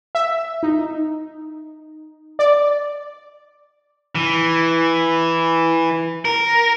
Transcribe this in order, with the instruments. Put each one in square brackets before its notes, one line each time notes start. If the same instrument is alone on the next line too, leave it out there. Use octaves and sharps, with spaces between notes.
[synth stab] E5
D#4
D5
[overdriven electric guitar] E3
A#4